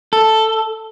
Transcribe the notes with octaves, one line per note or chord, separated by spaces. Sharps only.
A4